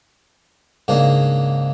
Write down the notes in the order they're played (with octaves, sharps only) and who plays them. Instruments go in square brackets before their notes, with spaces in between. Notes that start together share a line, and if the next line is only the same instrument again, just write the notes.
[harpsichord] G#2 C#3 A#3 D4